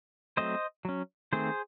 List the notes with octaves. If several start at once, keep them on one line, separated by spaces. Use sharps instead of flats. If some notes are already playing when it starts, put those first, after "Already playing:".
F#3 A3 C4 C5 D#5
F#3 C#4
D#3 A3 C4 G#4 C5